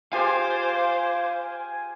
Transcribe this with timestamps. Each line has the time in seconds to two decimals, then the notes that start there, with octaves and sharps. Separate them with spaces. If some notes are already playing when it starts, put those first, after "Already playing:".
0.13 F4 G4 G#4 C5 F5 G#5 D6